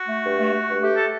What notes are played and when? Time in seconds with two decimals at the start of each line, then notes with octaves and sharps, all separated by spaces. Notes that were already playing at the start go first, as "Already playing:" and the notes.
Already playing: F#4
0.08 A3
0.24 G2
0.38 A3
0.54 A3
0.68 G2
0.83 A3 G4
0.97 A4